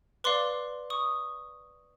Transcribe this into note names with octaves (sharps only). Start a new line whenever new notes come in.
B4 D5 F5 C6 D6
C#6 D#6